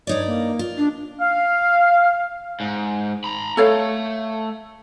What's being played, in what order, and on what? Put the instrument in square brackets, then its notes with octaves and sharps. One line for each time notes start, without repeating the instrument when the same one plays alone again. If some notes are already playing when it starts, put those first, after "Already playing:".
[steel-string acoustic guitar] G2 D#4 D5 [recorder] C#5
[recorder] A#3
[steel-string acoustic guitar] F4
[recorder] D4
[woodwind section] F5
[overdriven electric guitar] G#2
A#5 B5
[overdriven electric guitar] A3 [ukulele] A4 C#5 F5